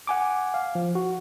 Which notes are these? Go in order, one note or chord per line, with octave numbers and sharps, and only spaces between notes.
F#5 G#5 D6
F5
F3
F#4